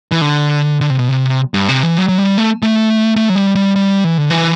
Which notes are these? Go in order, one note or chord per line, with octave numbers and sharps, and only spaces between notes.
E3
D3
D3
C3
B2
C3
G2
C3
E3
F#3
F#3
G3
A3
A3
A3
F#3
G3
G3
G3
E3
D3
E3